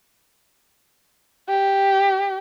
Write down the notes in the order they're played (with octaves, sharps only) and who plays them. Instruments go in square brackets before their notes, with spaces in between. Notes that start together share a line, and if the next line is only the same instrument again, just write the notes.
[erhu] G4